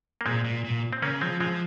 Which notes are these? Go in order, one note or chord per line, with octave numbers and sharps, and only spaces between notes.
A#3
A#2 G#3 C4
A#2
A#2
C4
C#3 A#3 C#4
F3 G#3 C4
F3 G#3 C4